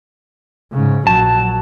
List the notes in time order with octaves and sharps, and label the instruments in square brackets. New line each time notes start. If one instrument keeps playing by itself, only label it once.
[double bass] G#2 C#3
[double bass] A#1 F#3 [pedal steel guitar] A5